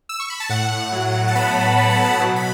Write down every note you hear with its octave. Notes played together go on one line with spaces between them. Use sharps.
E6
C#6
B5
A5
A2 F#5
F#3
A5
B3 B5
F#3 A5
F#5
A5
B2
B5